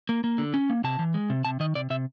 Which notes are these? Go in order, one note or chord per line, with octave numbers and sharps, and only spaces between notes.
A#3
A#3
D3
C#4
A#3
C3 A5
E3
G#3
C3
C3 A5
D#3 D#5
C3 D5
C3 E5